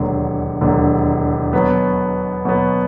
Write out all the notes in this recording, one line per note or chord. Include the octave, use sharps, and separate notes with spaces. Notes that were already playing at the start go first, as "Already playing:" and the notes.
Already playing: E1 D#2 D3 F#3
E1 D#2 D3 F#3
B2 F#3 B3
B2 F#3 B3